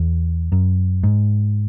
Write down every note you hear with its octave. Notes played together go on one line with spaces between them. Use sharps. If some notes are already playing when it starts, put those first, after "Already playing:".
Already playing: E2
F#2
G#2